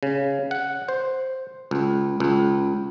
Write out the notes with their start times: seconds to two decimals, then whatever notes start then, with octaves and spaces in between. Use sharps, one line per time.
0.03 C#3
0.51 F#5
0.88 C5
1.71 C#2
2.20 C#2